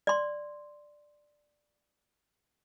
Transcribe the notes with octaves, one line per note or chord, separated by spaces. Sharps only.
D5 C6